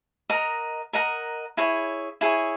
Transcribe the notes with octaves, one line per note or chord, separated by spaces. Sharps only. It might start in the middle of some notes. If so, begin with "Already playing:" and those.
A#4 D#5 F#5 A#5
A#4 D#5 F#5 A#5
E4 G#4 C#5
E4 G#4 C#5